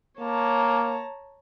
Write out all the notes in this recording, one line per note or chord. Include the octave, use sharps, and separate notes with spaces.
A#3 C#5 A5 A#5